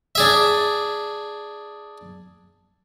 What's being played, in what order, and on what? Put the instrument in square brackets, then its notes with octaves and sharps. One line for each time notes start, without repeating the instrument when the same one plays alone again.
[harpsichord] D4 G#4 E5